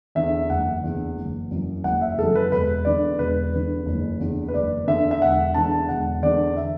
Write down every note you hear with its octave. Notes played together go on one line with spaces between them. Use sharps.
E2 D3 E5
F#1 F#5
E2 D3
F#1
F#2 E3
F#1 F#5
E5
F#2 E3 A4
B4
E1 B4
E2 D3 D5
E1 B4
E2 D3
F#1
E2 D3
B4
F#1 D5
E2 D3 E5
E5
E1 F#5
E2 D3 A5
E1 F#5
E2 D3 D5
E5